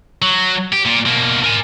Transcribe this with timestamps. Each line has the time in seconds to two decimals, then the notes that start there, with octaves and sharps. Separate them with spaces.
0.22 F#3
0.73 G4
0.85 A#2
1.06 B2 A#3
1.44 A#4 G#5